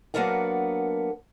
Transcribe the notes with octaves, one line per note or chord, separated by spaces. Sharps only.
F#3 A#3 B3 D4 A#4 F#5